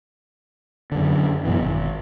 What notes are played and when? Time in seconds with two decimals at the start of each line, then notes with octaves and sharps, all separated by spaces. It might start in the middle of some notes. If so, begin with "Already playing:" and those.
0.92 F#2 D3
1.45 F#2 B2 E3
1.61 G#1